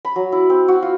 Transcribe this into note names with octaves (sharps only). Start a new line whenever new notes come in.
B5
F#3
E4
C4
F#4
F4